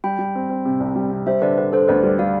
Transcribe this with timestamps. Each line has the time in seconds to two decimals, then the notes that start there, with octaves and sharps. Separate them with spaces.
0.04 G3 G5 B5
0.19 G3
0.35 C4
0.49 C4
0.65 C3
0.80 C2
0.96 G3
1.11 C3
1.26 G3 C5 E5
1.42 D3 B4 D5
1.58 D3 B4
1.72 D3 A4 C5
1.88 D2 B4 D5
2.03 G3
2.19 G3 D5 F5